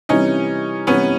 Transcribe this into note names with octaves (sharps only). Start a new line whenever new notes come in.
C3 E3 G3 C#4 D#4
C3 E3 G3 B3 C#4